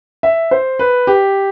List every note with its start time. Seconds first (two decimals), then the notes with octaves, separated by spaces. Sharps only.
0.23 E5
0.51 C5
0.79 B4
1.07 G4